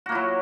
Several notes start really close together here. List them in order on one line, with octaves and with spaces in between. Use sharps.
F#4 A#3 E4 F#3